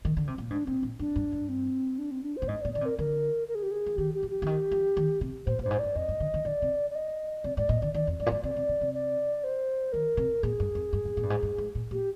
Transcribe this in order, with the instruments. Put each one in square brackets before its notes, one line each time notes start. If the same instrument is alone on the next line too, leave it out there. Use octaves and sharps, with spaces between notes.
[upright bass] D#3
D3
C3
A#2
[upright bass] G#2 [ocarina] D4
[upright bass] A#2 [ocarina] C4
[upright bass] A#2
[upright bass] G2 [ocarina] D4
[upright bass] G2
G2
[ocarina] C4
D4
C4
D4
C5
[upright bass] A#2
[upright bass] G#2 [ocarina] D#5
[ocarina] D5
[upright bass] A#2
[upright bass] D3 [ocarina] D5
[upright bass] C3
[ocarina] A#4
[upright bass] D3 [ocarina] A#4
[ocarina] A#4
G#4
G4
G#4
[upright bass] F3
[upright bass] D#3 [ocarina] G4
[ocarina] G4
[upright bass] F3
[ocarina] G4
[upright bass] D3
D#3
F3
D#3
C3
[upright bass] A#2 [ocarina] C5
[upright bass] A#2
[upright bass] G2 [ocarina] C5
[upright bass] G#2
[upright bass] G2 [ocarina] D5
[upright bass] F2 [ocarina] D#5
[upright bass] G2
D3
D3
[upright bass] D3 [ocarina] D5
[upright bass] C3
[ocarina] D5
D#5
[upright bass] C3 [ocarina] D5
[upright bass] G#2 [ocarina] D5
[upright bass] A#2 [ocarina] D#5
[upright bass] D3 [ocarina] D5
[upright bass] D#3 [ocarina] D5
[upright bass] F2
[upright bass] G2 [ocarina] D5
[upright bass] A#2
[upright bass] G#2 [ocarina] D5
[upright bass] C3 [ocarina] D5
[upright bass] C3
C3
C3
[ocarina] D5
C5
[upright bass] D#3 [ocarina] A#4
[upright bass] C3
[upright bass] A#2 [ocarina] G#4
[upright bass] G2
F2
G2
A#2
A#2
G2
G#2
G2
G#2
A#2
[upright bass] A#2 [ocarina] G4